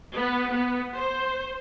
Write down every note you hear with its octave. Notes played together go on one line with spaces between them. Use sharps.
B3
B3
C5